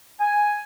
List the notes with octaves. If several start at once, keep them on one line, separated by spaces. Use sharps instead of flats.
G#5